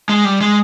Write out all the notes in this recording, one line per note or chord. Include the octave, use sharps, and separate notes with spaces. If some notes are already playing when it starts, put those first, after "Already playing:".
G#3
G3
G#3